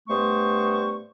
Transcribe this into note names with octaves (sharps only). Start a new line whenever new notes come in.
G2 A3 B3 C5 C#6